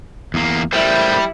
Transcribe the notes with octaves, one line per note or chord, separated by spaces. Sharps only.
E2 A#3
G3 A3 E4 A#4 C5